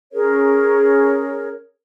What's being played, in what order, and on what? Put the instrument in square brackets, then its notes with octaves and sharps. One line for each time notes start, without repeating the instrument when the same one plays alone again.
[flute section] C#4 G#4 A#4 C#5